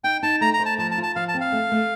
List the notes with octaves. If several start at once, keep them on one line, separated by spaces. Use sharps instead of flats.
D#4 G5
D#4 A5
A3 A#5
A#5
C5
A5
F3 A5
A5
F4
A5
F3 F5
A5
C4
F5
A3
A3